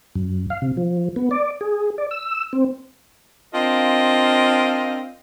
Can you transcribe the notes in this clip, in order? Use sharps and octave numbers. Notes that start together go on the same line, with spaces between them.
F#2
F5
C3
F3
B3
D5
G#4
D5
E6
C4
C4 D4 F4 A#4 D#5 F5